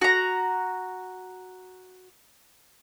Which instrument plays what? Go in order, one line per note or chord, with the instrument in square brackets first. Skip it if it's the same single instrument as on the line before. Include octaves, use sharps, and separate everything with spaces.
[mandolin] F#4 A#5